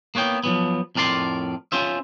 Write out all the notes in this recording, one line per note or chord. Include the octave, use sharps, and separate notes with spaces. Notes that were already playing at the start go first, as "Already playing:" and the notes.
A#3 B3 C#5 G5
F3 F#3 B3
F2 A2 A#4 D5 C6
C#4 F4 C5 E5